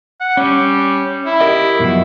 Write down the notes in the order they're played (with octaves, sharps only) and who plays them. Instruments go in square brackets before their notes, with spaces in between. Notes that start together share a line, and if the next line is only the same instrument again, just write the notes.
[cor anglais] F#5
[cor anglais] G3 [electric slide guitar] C#4
[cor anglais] E4
[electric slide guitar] G4 A#4 D#5
F#2 B2 F3